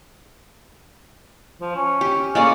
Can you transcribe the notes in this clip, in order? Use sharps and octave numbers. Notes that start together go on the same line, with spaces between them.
F3
C#4
G4
G#3 A#3 C#4 D5